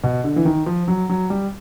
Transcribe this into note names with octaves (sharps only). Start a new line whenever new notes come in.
B2
D3
E3
D#3
F3
F#3
F#3
G3